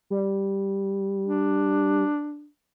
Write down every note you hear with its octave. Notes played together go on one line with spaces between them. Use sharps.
G3
D4